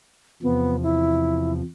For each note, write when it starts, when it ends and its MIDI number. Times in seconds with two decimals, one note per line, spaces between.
0.43 1.62 40
0.43 1.62 48
0.43 1.62 53
0.43 0.76 59
0.83 1.53 64